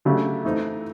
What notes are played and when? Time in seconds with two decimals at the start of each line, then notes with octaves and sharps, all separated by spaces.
0.05 C#3 F#3 A3 D4 G4
0.45 E3 A3 C4 D#4